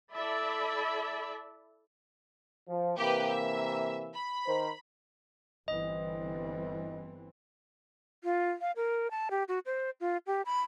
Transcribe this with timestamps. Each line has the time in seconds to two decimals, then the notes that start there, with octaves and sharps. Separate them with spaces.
0.14 E4 A4 D5 E5 A5 B5
2.68 F3
2.98 C3 E3 A#3 G4 B4
3.30 E5
4.14 B5
4.47 D#3 A#4 C5
5.68 G1 E3 C4 D#5
8.24 F4
8.61 F5
8.76 A#4
9.11 A5
9.31 G4
9.48 F#4
9.66 C5
10.00 F4
10.27 G4
10.46 B5